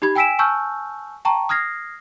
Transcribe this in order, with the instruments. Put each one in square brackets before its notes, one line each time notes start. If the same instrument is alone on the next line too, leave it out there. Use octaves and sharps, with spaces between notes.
[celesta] D#4 G4 B5 G#6
G5 G#5 E6 B6 D7 E7
G#5 A5 C#6 E6 F6 G6
G5 A5 A#5 C#6
D#6 F6 G#6 A#6 C7